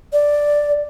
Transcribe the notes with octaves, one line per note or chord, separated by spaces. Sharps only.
D5